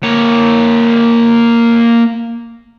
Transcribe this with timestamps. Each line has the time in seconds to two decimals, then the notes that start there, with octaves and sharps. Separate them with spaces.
0.04 A#3 C#5